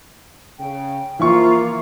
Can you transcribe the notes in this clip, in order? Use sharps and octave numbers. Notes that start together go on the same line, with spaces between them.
C#3 G5
E3 F3 A#3 E4 F4 C#6